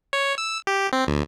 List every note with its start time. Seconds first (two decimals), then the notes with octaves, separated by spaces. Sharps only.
0.13 C#5
0.38 E6
0.67 G4
0.93 C4
1.07 D2